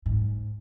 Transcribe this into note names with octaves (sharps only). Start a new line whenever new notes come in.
G#2